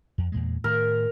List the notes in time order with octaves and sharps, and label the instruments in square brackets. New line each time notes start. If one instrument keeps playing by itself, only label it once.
[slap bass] F2
E2 A#2 G#3
[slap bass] A2 D#3 [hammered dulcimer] A#4